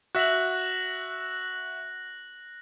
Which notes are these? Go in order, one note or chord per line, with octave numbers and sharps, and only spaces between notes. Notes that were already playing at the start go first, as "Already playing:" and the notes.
F#4 E5 F#6 A#6 F#7